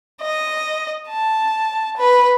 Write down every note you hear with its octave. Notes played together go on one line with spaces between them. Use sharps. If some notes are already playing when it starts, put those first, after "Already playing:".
D#5
A5
B4